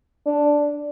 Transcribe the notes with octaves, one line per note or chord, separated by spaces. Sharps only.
D4